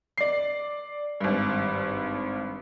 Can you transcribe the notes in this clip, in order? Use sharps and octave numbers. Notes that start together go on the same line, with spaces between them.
D5 C7
G#1 G2